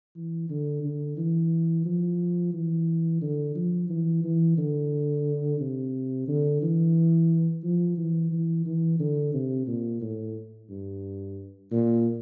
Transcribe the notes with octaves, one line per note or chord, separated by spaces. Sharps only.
E3
D3
D3
E3
F3
E3
D3
F3
E3
E3
D3
C3
D3
E3
F3
E3
E3
E3
D3
C3
A#2
A2
G2
A#2